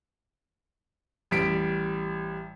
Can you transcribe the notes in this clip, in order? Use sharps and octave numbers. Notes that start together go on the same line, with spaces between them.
A1 G3 B6 D7